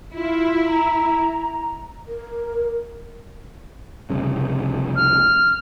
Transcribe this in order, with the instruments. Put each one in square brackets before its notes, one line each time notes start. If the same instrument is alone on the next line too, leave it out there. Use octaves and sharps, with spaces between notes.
[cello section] E4 [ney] F4
[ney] A#5
A#4
[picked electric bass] F1 C2 C#3
[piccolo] F6